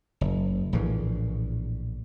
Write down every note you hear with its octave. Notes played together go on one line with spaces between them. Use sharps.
F#1
A#1 A2 C#3 E3